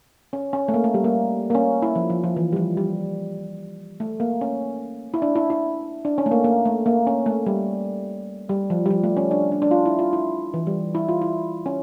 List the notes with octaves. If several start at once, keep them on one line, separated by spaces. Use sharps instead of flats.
C#4
C#4
A3
A#3
A3
G3
A#3
A#3
C#4
E4
F3
F3
F3
E3
G3
F3
G3
A3
A#3
C#4
E4
D4
E4
E4
D4
C#4
A3
A#3
A#3
A3
A#3
C#4
A3
G3
G3
F3
G3
F3
A3
C#4
D4
D4
D4
F4
E4
F4
E4
E3
G3
E4
F4
E4
C#4